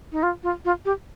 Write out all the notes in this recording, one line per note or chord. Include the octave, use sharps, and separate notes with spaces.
D#4
F4
F4
F4
G4